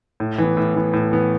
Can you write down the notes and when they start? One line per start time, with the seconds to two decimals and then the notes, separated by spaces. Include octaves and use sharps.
0.20 A2
0.38 E3 B3
0.57 A2
0.75 E3 B3
0.93 A2
1.11 E3 B3